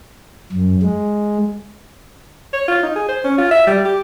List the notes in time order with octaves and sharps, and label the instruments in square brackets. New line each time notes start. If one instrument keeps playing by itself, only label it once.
[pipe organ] F#2
G#3
[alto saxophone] C#5
F4
D#4
G#4
C5
C#4
F4
E5
G3
G4